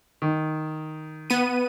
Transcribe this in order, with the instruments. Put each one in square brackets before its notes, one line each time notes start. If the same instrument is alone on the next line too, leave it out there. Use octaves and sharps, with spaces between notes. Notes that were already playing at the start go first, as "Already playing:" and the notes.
[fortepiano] D#3
[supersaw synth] B3 D#7